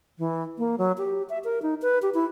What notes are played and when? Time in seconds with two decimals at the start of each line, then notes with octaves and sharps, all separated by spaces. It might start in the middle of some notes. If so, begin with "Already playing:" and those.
0.18 E3
0.58 A#3
0.78 F#3
0.98 G4
1.29 E5
1.44 A#4
1.62 D#4
1.82 B4
2.02 G4
2.14 E4